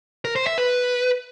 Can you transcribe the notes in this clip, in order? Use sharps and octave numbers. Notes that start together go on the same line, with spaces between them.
A#4
C5
E5
B4